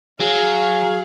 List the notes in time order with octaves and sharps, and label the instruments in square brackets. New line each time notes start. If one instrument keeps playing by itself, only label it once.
[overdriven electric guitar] F#3 [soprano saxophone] G#4 [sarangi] F5